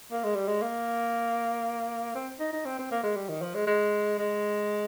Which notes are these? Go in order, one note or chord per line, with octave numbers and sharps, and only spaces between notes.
A#3
G#3
G3
G#3
A#3
C4
D#4
D#4
C4
C4
A#3
G#3
G3
D#3
F3
G#3
G#3
G#3